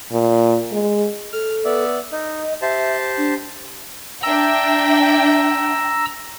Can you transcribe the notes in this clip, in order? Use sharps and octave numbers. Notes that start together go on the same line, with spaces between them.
A#2
G#3
A4 F6
B3 D5 E5
D#4 D#5
G4 C5 E5 A5
D4
D4 E5 G5 A#5 E6